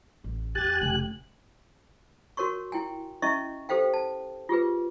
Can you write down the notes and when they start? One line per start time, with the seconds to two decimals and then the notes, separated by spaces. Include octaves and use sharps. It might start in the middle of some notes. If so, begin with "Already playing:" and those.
0.24 A1
0.55 E2 G4 G#5 F#6 A6
0.81 F1 C#3 F#7
2.37 F#4 A#4 C#5 C6 C#6
2.72 E4 G5 G#5
3.22 C#4 E4 D#5 E5 C#6
3.69 G4 A4 C5 F5 G5
3.94 A5
4.49 F4 G4 G#4 B4